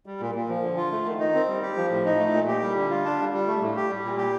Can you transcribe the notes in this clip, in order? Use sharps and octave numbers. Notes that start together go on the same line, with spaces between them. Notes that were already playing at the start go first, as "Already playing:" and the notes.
G3
A#2
A#2
F3
D3
F4
A3
D#3
D#4
C4
G3
G4
F3
A2
D#4
A3
A#2
G4
G3
D3
F4
D4
G3
G3
A3
A2
G4
G3
A#2
G4